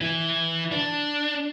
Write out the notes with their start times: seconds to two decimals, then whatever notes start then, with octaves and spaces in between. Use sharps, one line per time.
0.01 E3 E4
0.72 D4